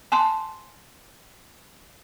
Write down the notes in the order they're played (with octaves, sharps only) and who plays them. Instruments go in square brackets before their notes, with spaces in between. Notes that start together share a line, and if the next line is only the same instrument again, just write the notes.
[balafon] G#5 A5 C6